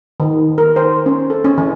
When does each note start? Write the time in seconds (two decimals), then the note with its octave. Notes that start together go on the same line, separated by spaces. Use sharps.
0.20 D#3
0.58 A#4
0.76 C5
1.06 C#4
1.30 A4
1.45 C#4
1.58 E3